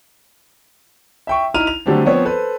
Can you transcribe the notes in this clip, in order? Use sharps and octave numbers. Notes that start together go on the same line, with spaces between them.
E5 G5 C#6
D#4 E4 A#5 F6 D#7 F7
F7
D3 F#3 G3 A3 C4 D4
F3 B3 C4 C#5
A4 B4 C5